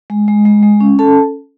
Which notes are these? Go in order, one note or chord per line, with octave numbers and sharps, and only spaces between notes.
G#3
G#3
G#3
G#3
C#4
C#4 A4 A5